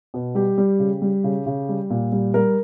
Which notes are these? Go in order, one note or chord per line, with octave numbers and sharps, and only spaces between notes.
B2
G3 G4
G3
C#3
G3
C#3
C#3
G3
A#2
G3
G3 A#4